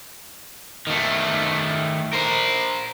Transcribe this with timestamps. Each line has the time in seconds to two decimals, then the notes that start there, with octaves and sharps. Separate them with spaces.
0.87 D#3 A3
2.13 A#4 C5